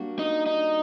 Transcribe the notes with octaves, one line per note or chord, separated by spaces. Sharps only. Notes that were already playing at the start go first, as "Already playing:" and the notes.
Already playing: G3 A#3 D4 F#4
D#4
D#4